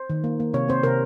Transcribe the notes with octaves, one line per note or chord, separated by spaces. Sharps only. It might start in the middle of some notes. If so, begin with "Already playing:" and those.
Already playing: C5
D#3
A#3
A#3
C3 C#5
C4 C5
C3 A#4